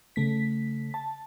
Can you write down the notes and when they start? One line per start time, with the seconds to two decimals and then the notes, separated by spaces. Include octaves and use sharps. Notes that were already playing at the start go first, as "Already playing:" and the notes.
0.16 C#3 A3 B6
0.94 A5